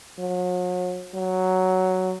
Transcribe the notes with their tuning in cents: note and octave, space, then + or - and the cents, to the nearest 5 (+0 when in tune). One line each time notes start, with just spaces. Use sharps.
F#3 -40
F#3 +5